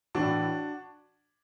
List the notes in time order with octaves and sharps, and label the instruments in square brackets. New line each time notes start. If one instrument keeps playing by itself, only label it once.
[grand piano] A2 E3 D4 F#4